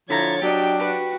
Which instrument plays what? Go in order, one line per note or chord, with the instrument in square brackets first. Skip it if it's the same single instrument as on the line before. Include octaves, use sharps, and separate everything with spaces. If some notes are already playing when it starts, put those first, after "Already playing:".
[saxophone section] D3 F3 C#5 [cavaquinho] E4 A#5 [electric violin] G#6 A6
[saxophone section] F#3 D4 [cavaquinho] G4 D#5 [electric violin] G5
[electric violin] F#4 [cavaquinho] G4 B4